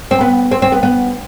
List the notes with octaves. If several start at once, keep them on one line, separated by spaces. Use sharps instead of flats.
C4
B3
C4
C4
B3
B3